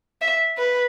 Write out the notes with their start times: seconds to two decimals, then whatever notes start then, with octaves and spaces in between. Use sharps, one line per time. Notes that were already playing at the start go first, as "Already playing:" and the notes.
0.21 E5
0.58 B4